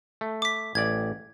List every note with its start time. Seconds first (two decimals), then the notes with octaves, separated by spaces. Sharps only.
0.21 A3
0.42 D6 B6
0.75 A1 D5 G#6